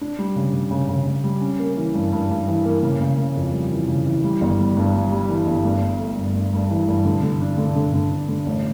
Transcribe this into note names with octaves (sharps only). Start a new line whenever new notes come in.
D4
G3
C#3
C#3
C#3
C#3
C#3
G3
C#4
A#3
E3
G2
G2
G2
E3
A#3
C#3
C#3
C#3
F2
G3
E3
C#3
E3
G3
G1
G3
G2
G3
G3
E3
G1
G2
G2
A3
G2
G2
G2
E3
G2
D3
D3
D4
D3
D3
D3
D4
D3
A1